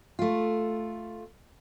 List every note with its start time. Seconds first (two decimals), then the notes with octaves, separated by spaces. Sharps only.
0.19 A3 F4